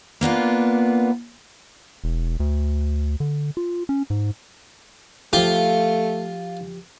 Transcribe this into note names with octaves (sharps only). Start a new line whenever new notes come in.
A#3 B3 D4 F4
E1
D2
D3
F4
C#4
G#2
F3 A3 F4 G4